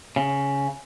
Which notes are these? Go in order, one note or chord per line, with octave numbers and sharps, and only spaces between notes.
C#3